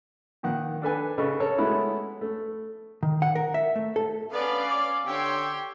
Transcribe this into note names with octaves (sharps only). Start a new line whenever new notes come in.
A#2 D#3 F#5 F#6
D4 A4 B4 G#5
C#3 A4 B4 D#5 C#6
A4 A#4 C#5 A5
G#3 A3 B3 C#4 E4 F#4
A3
D#3
F#5
A#4
E5
A3
A4
B3 C#4 D4 D5 F5
D6
D3 G4 C#5 G5 C6 E6